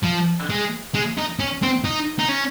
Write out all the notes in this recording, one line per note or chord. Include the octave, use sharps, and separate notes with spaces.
F3
G#3
G#3
D#4
C#4
C4
D#4
D#4
C#4